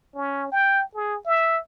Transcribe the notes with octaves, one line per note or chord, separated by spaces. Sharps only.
C#4
G5
G#4
E5